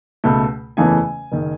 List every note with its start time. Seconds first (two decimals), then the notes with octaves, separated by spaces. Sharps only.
0.24 C#2 B2 A3
0.77 F#1 E2 C#3 E3 A3 G#5
1.32 F#1 D#3